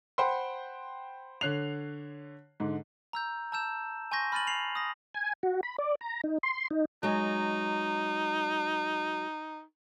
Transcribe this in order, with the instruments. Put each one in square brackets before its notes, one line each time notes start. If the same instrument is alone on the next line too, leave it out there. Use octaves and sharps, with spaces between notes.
[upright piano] C5 F#5 G5 B5 C6
D3 C#5 F#6 C7 F7
G#2 D3
[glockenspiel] A#5 E6 G6
A5 A#5 E6 G6 E7
G#5 C6 C#6 G6 A#6
B5 F6 G6 A6 D#7 F#7
C7 F7 F#7
D#6 A#6
[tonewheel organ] G#5
F#4
B5
D5
A#5
D#4
C6
D#4
[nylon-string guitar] F#3 G#3 [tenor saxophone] D#4